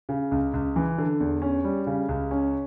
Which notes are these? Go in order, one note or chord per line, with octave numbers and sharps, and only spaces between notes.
C#3
C#2
C#2
E3
D3
E2
C#4
G3
C#3
C#2
C#4